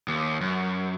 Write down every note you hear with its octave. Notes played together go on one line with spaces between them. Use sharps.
D#2
F#2